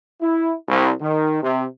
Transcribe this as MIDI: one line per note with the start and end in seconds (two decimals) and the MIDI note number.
0.20 0.53 64
0.68 0.91 36
1.00 1.37 51
1.42 1.64 48